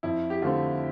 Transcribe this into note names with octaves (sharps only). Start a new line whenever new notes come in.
F2 E4
G4
D3 A3 C4 F4